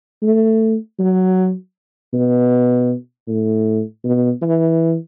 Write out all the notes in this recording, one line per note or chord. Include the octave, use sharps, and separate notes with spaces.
A3
F#3
B2
A2
B2
E3